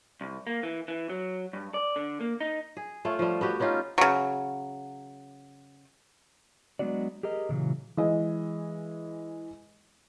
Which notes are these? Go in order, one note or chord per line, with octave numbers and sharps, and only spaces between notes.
C2
A#3
E3
E3
F#3
G2
D5
D3
A#3
D#4
G#4
A3 F4 C#5
F3 G3
B3 F#4 G4
B3 C#4 D#4 F4
C#3 F#3
F#3 G#3 B3 D4 F#4 D5
G4 G#4 A#4 D#5
A#2 C#3 E3 F#3
E3 G#3 D#5